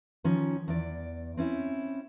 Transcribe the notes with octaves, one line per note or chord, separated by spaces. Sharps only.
D#3 F3 C#4
E2 D5
C4 C#4 E4